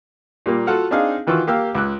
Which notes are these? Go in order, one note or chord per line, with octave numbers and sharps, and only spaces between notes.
A#2 G3 A#3
F4 F#4 A4 F#5 F6
C4 D4 D#4 G#4 F5
D#3 E3 F4 F#4 C#6 E6
A#3 G4 F5 E6
C#2 D6 E6 F#6